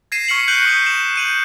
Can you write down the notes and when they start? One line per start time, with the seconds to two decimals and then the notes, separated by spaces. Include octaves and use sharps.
0.12 G#6 A#6 C7 D#7 E7
0.28 C#6 F6 B6 C#7 F#7
0.48 F#6 G6 C#7 D7 F#7 G7
0.65 C#6 D#6 B6 C7 E7 F#7
0.86 E7 F#7
1.16 G6 D#7 F#7